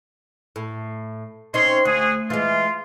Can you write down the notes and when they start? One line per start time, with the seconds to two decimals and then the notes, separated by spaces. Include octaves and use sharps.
0.56 A2
1.54 C4 C#4 D#4 C#5 C6
1.85 D2 F#4 G#4
2.30 E3 G#3 F4